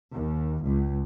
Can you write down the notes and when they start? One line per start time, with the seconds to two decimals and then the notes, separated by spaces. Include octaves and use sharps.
0.12 D#2
0.63 C#2